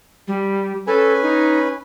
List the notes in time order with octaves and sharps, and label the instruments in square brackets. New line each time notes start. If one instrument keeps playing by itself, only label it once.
[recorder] G3
[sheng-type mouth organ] C#4 B4 G#5 [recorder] A4
[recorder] D#4